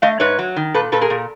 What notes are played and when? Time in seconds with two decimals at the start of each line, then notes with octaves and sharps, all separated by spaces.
0.02 A3 D#5 F5
0.20 G#2 B4 C#5
0.39 F#3
0.56 D#3
0.74 A#2 A4 B4
0.92 A#2 A4 B4
1.01 G#4 A#4
1.10 A#2